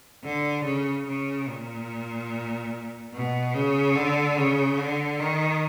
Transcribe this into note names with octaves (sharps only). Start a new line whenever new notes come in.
D3
C#3
C#3
A#2
B2
C#3
D3
C#3
D3
D#3